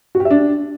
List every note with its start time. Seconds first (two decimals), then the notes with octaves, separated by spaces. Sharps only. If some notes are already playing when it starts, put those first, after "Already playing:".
0.15 F#4
0.20 G4
0.25 E5
0.31 D4